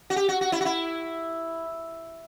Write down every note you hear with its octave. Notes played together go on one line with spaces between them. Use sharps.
F#4
G4
F#4
F#4
E4
F#4
E4